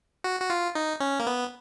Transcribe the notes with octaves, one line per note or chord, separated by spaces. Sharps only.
F#4
F#4
F4
D#4
C#4
A#3
B3